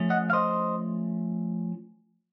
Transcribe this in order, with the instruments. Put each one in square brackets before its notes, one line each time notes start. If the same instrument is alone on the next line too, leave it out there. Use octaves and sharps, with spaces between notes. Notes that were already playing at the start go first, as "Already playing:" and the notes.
Already playing: [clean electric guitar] F3 A3 C#4
D#5 F#5
F5
C5 D#5